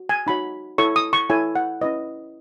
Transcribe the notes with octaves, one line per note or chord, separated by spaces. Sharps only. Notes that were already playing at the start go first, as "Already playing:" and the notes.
Already playing: F#4
G#5
D#4 F#4 C#5 B5
E4 A4 C#5 C#6
D#6
C#6
E4 A4 C#5 G#5
F#5
C#4 E4 B4 D#5